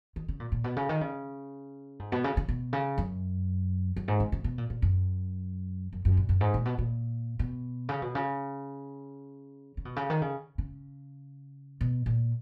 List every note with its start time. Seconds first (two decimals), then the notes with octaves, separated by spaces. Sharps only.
0.16 D#3
0.28 C#3
0.40 A#2
0.52 A#2
0.64 B2
0.76 C#3
0.89 D#3
1.01 C#3
1.99 G#2
2.12 B2
2.24 C#3
2.37 C#3
2.49 B2
2.73 C#3
2.98 F#2
3.96 F#2
4.08 G#2
4.20 C#3
4.32 C#3
4.44 B2
4.58 A#2
4.70 A#2
4.82 F#2
5.93 F#2
6.05 F#2
6.17 A#2
6.29 F#2
6.41 G#2
6.54 A#2
6.65 B2
6.79 A#2
7.39 B2
7.89 C#3
8.02 B2
8.15 C#3
9.77 C#3
9.85 B2
9.96 C#3
10.10 D#3
10.21 C#3
10.58 C#3
11.81 B2
12.06 A#2